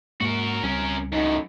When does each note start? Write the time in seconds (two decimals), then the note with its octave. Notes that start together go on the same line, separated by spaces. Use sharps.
0.21 G#2 G#3 A#3 F#4 A#4
0.63 C#2 G3 C4 C#4 A#4
1.13 F#2 A2 D#4